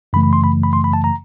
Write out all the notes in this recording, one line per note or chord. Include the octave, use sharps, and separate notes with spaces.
F#2 C#3 E3 A3 B5
B5
C6
B5
B5
C6
B5
A5
A#5